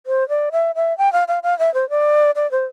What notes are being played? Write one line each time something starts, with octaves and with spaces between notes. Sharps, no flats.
C5
D5
E5
E5
G5
F5
F5
F5
E5
C5
D5
D5
C5